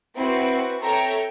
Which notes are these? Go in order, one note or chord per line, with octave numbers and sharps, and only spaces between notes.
C4 E4 F#4 B4
A4 C#5 E5 G5 A#5